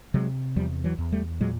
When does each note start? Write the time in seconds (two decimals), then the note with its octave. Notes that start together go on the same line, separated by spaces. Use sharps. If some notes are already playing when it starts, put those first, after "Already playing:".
0.14 C3 F#3 G#3
0.56 E2 F3 G3
0.84 E3 F#3
0.98 E2
1.12 G3 A3
1.41 A#2 F#3 G#3